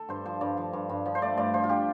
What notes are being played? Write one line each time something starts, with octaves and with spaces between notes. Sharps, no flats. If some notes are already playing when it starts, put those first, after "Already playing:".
Already playing: A4
G2 C5
F3 C5
G2 D5
F3
G2
G2
F3
C5
A3 D5
G2 D5
F3 C5
F4
G4